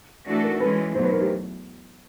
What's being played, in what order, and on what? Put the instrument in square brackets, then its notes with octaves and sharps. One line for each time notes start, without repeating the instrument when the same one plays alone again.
[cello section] E3 A3 D4 F#4 A4
[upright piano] A#4
[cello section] E3 G#3 C#4 [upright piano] B4
[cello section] E2 B2 F#3 A3 [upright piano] C5
[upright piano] B4
A#4
G4